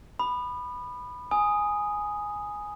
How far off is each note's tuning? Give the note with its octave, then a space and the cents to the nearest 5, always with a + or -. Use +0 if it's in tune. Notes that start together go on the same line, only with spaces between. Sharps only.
B5 +0 D#6 -40
G#5 +0 D#6 +0